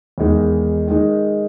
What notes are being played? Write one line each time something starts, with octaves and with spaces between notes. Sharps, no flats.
E2 D#3 G#3 D#4
D#3 G#3 D#4